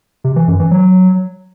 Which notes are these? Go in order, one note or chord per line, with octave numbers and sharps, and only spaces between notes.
C3
E3
F#2
E3
F#3